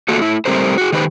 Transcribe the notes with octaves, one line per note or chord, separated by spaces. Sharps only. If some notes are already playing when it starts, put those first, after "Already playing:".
A3 A#3 F4 F#4 A4
A3 E4
G3 A3 C4 G4 A#4 C5
F#4 G#4
D#3 D#4 G4 B4 C5